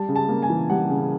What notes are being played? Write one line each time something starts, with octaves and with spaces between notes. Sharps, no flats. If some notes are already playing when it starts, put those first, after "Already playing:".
Already playing: G3 A5
C#3
A5
A#3
G#5
E3
G3 F#5
C#3